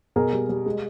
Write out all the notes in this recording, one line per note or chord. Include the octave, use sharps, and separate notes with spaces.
B2 G#4 A#4
G3
G3
G#3